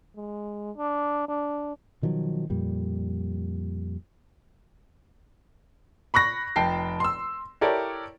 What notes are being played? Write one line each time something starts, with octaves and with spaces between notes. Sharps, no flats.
G#3
D4
D4
B2 D#3 F3 F#3
F2 A#2 G3
B5 C#6 F#6 A#6
F1 G5 A5 C7
C6 E6
E4 G4 A4 A#4 C#5 D5